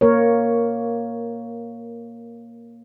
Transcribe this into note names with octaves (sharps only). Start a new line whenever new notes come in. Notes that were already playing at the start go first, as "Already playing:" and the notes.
A#3 A#4 C#5